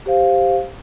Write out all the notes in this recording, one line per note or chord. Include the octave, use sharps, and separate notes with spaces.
G4 C5 F5